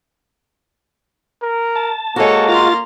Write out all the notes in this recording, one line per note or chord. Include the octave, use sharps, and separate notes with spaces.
A#4
A5
G#3 A#3 F#4 A4 C#5
F4 A#5 C6 A6